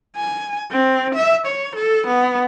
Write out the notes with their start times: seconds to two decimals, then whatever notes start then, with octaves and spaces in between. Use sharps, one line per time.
0.16 G#5
0.71 C4
1.15 E5
1.46 C#5
1.76 A4
2.07 B3